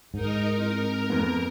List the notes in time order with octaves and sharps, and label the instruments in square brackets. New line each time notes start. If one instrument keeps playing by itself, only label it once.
[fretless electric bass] G#2 [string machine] D#4 A#4
[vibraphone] C4 E4 [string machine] A#4
[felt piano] F2 B3